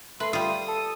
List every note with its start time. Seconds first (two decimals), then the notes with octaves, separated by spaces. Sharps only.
0.20 A3 B4 C6
0.33 G3 F4 D#6
0.68 A4